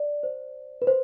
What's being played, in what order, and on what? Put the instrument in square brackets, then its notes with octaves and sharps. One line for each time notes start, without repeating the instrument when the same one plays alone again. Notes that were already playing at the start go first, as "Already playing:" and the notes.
Already playing: [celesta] D5
C5
B4
C5